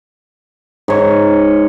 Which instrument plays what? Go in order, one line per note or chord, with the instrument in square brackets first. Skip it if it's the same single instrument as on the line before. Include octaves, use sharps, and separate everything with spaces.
[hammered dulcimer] G#2 C#5